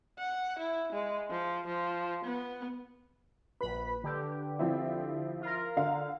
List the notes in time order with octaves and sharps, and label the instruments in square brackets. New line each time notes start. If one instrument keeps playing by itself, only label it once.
[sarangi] F#5
E4
G#3
F3
F3
B3
[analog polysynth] A#1 B5 [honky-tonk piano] B4
[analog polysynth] D3 G4
[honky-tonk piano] F3 C4 E4
[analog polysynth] F4 A#4
[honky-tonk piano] D3 F5